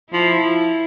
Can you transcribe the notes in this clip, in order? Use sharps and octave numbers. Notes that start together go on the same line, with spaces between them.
F3 E4